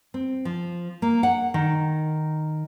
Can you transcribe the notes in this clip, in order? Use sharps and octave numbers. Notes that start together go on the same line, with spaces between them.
C4
F3
A#3
F#5
D#3